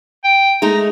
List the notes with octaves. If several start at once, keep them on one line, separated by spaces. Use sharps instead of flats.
G5
G#3 A3 D#4 A#5